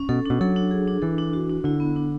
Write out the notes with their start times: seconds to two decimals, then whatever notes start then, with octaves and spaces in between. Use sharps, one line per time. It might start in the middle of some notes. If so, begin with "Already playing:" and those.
Already playing: C#4
0.09 B2 A4
0.26 B2 D4
0.41 F#3 A4
0.56 D4
0.71 G#4
0.87 D4
1.02 E3 A4
1.18 D4
1.33 F#4
1.50 D4
1.64 D3 E4
1.80 B3
1.96 D4